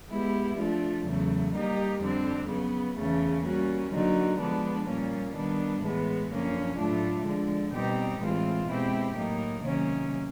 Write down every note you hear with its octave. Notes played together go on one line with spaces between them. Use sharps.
G#3 B3 E4 G4
F3 A3 D4 F4
E2 C#3 F#3 A3
G3 A#3 D#4 G4
F2 D3 G3 C4
C#3 F#3 B3
E2 C#3 E3 A3 C#4
G3 A#3 C#4 F#4
D3 F#3 A#3 D#4 F#4
D3 F3 G#3 B3 D4
A#2 G3 A#3 C#4
D#3 G3 B3 D4
A2 E3 G#3 B3
F#2 D3 F3 A#3 C#4
A2 F#3 A3 D4 F4
D3 F3 G#3
B2 G3 C4 D#4 G4
A2 E3 G#3 C4 F4
B2 G#3 C4 E4 G4
A2 F#3 A#3 D#4
C3 D#3 F#3 A#3 C#4